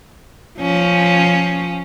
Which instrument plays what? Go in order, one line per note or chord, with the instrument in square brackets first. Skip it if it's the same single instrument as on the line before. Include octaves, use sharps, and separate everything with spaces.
[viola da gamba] F3 C#4